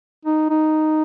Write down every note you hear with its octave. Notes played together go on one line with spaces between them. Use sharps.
D#4
D#4